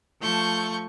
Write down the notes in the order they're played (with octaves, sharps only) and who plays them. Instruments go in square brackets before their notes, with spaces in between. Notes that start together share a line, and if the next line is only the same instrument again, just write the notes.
[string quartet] F3 A3 C#6 G6